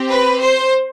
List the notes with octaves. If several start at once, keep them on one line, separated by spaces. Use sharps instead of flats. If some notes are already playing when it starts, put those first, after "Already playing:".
Already playing: C4 G4
B4
C5